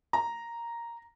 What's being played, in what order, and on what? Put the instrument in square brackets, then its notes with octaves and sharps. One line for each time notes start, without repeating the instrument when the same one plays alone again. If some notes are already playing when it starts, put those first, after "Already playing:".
[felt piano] A#5